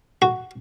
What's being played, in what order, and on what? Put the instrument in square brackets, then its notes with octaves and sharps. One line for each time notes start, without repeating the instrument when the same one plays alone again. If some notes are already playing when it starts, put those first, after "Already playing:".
[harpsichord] F#4